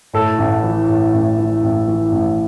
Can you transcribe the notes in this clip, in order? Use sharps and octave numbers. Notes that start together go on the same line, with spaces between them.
A2 A4
A1
E3
A2
A1
E3
A1
E3
A1